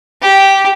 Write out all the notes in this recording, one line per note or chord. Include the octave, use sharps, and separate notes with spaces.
G4